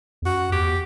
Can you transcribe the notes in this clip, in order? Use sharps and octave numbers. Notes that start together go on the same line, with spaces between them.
E2
F#2 F#4
E2 G4